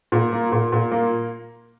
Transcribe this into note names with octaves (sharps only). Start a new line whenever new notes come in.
A#2
A#3
A#2
A#2
A#3